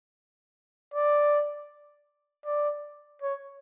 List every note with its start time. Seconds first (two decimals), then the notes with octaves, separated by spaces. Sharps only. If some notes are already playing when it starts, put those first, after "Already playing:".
0.94 D5
2.46 D5
3.22 C#5